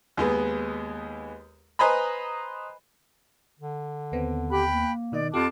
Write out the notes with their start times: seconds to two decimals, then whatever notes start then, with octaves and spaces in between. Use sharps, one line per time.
0.17 D#2 G#3 B3
1.79 B4 C5 D#5 G#5 A#5 B5
3.60 D3
4.12 D#2 B3 C4
4.51 G4 G5 B5 F#6
4.71 A#3
5.12 B2 D#3 D5 D#5
5.34 F2 F4 G4 A5 D6 F#6